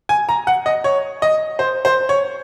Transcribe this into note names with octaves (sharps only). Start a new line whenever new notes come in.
G#5
A#5
F#5
D#5
C#5
D#5
C5
C5
C#5